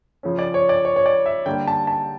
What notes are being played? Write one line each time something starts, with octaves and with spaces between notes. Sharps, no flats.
C#3 F3 C#4
D5
C#5
D5
C#5
C#5
D5
E5
D3 G3 A#3 G5
A5
A5